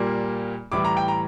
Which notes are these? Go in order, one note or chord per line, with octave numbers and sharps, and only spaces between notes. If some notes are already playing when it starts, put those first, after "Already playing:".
Already playing: A#2 G3 A#3
A2 E3 G3 D6
A#5
G5
A#5